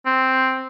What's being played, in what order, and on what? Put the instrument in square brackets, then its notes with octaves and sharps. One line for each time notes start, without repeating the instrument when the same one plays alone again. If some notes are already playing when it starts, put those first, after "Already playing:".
[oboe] C4